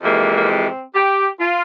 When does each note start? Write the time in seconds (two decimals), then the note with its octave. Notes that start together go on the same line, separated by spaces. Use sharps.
0.03 F2 C3 E3 G#3 A#3
0.36 A#3
0.49 C4
0.95 G4
1.40 F4